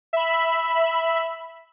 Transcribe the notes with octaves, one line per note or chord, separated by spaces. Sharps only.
E5 B5